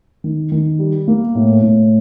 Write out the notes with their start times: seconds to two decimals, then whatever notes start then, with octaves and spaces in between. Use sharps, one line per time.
0.24 D#3
0.52 D#3
0.79 G3
1.08 A#3
1.35 A2
1.62 A2